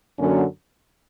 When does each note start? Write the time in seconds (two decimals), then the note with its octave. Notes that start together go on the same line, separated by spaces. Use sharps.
0.18 F#2 D3 F#3 A#3 C#4